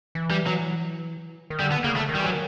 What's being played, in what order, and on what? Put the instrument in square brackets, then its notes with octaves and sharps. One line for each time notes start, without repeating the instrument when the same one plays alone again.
[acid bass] E3
[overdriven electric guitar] G3
F#3
[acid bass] D#3
[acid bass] D3 [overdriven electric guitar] G3
[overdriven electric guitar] B3
[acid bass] C#3 [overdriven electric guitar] A#3
[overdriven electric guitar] A3
[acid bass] D#3
[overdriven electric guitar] G3
[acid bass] E3 [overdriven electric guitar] F#3
[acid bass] D#3